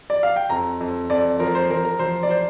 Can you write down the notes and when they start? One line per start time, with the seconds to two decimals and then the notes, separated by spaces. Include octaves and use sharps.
0.10 D5
0.23 F5
0.36 G5
0.50 F2 A#5
0.81 F2
1.10 F2 D5
1.39 F3 A#4
1.55 C5
1.70 F3 A#4
1.85 A#4
1.99 F3 C5
2.23 D5
2.30 C5